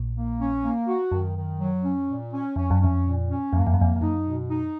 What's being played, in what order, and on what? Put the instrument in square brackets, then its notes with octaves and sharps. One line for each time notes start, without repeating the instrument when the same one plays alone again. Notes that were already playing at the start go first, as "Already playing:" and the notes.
Already playing: [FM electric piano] A#1 A#2
[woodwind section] A#3
C#4
A#3
F#4
[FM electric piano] F#2 [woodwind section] D#3
[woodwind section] D#3
F#3
C#4
A#2
C#4
[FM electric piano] F2 [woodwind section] C#4
[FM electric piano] F#2
[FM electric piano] F2 [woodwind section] C#4
[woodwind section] A#2
C#4
[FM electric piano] F2 [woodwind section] A#3
[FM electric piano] F#2
F2
F#2
[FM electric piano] F2 [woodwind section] A#3
[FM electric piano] F2
[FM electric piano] F#2 [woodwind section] D#4
[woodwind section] B2
D#4